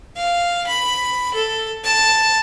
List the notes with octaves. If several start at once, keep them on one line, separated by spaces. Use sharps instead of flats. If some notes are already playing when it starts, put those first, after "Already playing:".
F5
B5
A4
A5